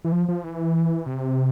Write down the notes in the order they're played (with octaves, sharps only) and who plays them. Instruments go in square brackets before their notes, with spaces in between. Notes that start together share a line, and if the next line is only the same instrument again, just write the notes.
[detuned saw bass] E3
F3
F3
E3
C3